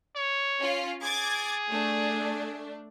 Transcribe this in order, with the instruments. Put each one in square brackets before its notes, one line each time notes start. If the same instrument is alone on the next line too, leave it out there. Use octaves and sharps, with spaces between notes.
[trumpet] C#5
[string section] C#4 F4
[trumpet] G#4 [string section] D6 G#6 A6
[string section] A3 D4